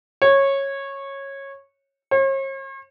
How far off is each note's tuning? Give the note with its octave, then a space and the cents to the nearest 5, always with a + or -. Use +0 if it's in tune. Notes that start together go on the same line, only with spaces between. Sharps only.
C#5 -15
C#5 -45